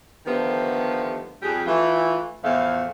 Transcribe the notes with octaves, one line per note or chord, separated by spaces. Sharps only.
D3 D#3 F3 A3 B3 G4
F2 G3 G4 G#4
E3 A3 F4
E2 A2 F3 A3 F5